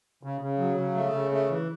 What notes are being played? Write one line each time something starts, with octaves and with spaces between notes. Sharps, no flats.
C#3
C#3
F#3
C#3
A3
C#3
A3
E3